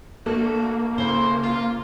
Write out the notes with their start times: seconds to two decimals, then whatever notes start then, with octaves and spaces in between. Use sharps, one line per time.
0.26 A3 A#3 D4 F#4 A4
0.98 C#3 E4 A4 C5
1.44 F4